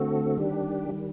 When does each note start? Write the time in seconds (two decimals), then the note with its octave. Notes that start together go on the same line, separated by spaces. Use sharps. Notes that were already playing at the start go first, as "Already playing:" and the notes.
Already playing: D3 A3 C4 F#4 A4
0.37 D#3 G3 D4 G4
0.89 D#3 G3